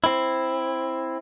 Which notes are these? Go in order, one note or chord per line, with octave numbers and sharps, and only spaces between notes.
C4 E4